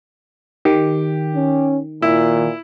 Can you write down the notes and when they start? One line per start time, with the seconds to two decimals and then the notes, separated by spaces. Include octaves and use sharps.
0.65 D#3 G4
1.35 C#4
2.02 A#2 E4